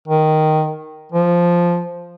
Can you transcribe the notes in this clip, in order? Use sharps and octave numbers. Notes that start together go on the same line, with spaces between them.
D#3
F3